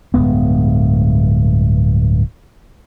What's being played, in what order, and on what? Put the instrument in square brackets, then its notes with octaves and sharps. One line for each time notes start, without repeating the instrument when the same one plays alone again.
[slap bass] D1 G2 G#3 B3